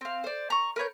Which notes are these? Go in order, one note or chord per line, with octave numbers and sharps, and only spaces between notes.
C4 F5
C5 D5
A#5 C#6
A#4 B4 C#5 G6